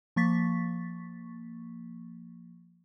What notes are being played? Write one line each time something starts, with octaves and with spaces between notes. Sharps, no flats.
F3 A#3 C#6 A6 B6